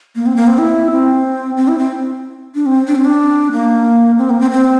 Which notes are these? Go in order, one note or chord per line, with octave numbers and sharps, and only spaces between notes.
A#3
C4
A#3
C4
E4
C4
C4
E4
C4
D4
C4
D4
C4
D4
A#3
C4
A#3
C4
C4